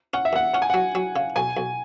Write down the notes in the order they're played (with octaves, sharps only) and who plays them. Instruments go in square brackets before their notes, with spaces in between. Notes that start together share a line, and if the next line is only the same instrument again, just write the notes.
[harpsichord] C#4 [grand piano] F#5
[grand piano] E5
[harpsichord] D#2 [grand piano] F#5
[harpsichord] C#4 [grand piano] F#5
[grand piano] G#5
[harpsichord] F#3 [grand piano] F#5
[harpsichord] F#3
C#3
[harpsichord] B1 [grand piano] G#5
[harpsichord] B1